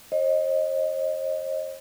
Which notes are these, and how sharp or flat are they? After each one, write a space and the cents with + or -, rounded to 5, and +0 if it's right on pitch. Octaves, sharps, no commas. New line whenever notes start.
C5 +45 D#5 +0